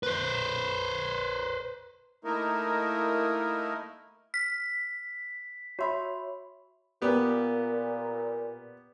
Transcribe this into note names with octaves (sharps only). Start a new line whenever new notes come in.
B4 C5
A3 A#3 D#4 E4 A#4
F6 B6
F#4 C#5 E5 B5 C6
A#2 B3 G4